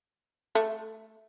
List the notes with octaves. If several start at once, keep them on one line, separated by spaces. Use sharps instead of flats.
A3